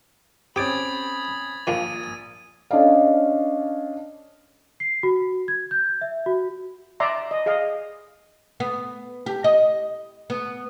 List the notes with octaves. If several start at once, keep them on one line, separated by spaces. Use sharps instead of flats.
C4 C#4 G4 B5 D6 D#6 G#6 A6
A#1 D#3 F3 A#3 D#7
C#4 D4 A4 D5 D#5 F5
C7
F#4
G#6
G6
E5
F#4
D5 E5 A#5 C6
D#5
G#4 D#5 F5
B3
G4
D#5
B3